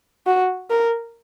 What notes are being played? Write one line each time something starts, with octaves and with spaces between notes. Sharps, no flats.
F#4
A#4